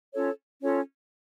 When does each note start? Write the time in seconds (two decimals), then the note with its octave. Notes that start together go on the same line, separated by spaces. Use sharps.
0.12 C#4 F4 A4 C#5
0.62 C#4 F4 A4 C#5